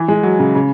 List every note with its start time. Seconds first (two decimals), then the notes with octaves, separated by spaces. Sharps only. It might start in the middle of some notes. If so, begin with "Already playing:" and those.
Already playing: E3
0.08 G#3
0.23 F#3
0.39 C#3
0.55 C#3